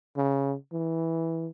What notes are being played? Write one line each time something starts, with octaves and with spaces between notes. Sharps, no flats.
C#3
E3